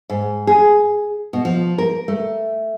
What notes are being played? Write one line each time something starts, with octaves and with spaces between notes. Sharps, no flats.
G#2
G#4
B2
F3
A#4
A3